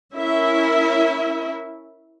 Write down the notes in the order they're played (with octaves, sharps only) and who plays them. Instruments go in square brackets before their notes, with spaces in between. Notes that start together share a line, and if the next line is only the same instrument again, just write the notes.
[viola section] C#4 E4 A#4 E5